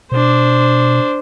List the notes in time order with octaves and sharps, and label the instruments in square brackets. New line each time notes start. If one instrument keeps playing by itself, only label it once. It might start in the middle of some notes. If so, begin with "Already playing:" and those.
[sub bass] B2 [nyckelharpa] D4 C5